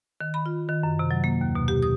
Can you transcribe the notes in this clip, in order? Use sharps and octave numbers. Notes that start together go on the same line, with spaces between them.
D#3
B5
F4
D#3
F#2
C3
F#3
A#3
D#2
B2
G4
D#6